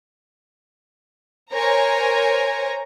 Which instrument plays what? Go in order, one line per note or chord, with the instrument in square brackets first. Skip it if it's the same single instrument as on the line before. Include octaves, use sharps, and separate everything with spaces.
[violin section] A#4 C5 C#5 G#5 A#5